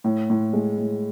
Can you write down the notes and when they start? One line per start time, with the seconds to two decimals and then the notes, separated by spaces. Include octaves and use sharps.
0.04 A2
0.30 A2
0.53 G#3
0.78 A2